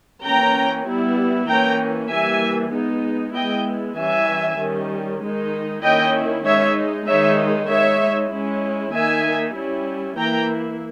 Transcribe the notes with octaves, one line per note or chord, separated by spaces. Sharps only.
E3 A#3 C#4 G5 A#5
G3 B3 E4
E3 A#3 C#4 G5 A#5
E3 G3 A#3 E5 G#5
G#3 B3 D#4
G#3 B3 E4 D#5 G5
E3 G3 C#4 E5 G#5
D#3 G3 C#4
D#3 G#3 D#4
D#3 A#3 C#4 E4 D#5 G5
G#3 D#4 C#5 E5
D#3 G#3 D#4 C#5 E5
G#3 D#4 C#5 E5
G#3 C#4 E4
D#3 A#3 D#4 E5 G#5
G3 C#4 E4
E3 A#3 E4 G5 A#5